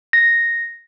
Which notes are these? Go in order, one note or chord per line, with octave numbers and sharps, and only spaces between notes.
A#6